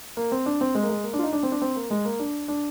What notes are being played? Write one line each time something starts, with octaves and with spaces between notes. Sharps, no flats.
A#3
C4
D4
C4
G#3
A#3
G#3
A#3
D4
F4
D#4
D4
C4
D4
C4
A#3
G#3
A#3
D4
D4